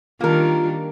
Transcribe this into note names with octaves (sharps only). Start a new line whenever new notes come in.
D#3 G3 A#3 D4 F4 A#4